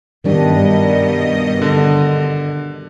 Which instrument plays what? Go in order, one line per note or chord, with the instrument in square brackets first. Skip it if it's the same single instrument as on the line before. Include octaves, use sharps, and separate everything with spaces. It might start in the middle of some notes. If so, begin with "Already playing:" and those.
[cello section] G2 B2 D#5 [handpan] D#3 G3 D4
[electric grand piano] D3